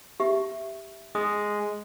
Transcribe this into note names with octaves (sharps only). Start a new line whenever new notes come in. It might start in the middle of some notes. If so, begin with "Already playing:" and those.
G4 E5
G#3 D#6